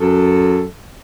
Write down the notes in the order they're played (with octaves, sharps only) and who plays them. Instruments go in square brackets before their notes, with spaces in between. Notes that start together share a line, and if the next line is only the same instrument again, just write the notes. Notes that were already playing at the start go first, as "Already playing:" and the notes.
[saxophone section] F#2 A4